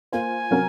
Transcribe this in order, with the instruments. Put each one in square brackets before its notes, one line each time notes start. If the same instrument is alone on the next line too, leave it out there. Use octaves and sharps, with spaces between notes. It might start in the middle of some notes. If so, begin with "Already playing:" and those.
[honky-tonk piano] A#3 F4 C5 [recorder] G#5
[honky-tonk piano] C3 F#3 C#4 F#4 A#4